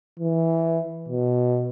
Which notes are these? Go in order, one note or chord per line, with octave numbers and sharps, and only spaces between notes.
E3
B2